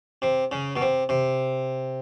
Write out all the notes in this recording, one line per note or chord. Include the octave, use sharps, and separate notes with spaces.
C3
C#3
B2
C3
C3